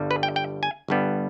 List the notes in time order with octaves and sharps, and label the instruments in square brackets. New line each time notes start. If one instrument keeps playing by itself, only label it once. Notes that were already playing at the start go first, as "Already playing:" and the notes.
Already playing: [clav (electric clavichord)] G1 G2 G3
B4
G5
G5
G#5
G1 G2 G3 B3